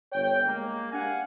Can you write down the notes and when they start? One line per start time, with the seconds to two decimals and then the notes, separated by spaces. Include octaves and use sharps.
0.12 G1 C#5 G5
0.46 G#3 A#3
0.92 D4 G4 F5 F#5 G#5